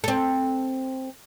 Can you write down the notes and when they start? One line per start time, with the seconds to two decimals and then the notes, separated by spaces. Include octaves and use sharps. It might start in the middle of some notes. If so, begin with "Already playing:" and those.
0.04 C4 A4